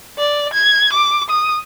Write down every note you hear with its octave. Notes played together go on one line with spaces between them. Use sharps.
D5
G#6
D6
D#6